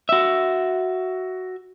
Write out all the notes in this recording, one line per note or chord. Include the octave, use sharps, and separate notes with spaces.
F#4 E5